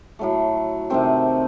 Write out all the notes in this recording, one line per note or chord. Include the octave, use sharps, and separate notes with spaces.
A2 F#3 A3
C3 D#3 A3 C4